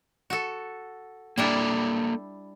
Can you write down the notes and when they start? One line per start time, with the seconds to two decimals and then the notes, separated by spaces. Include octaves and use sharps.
0.30 F#4 A4
1.38 G3 A#3 D4 E4 A4 D5